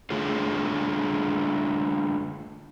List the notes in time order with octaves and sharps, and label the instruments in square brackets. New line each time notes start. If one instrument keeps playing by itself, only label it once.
[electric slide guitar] D3 A3 F4 G#4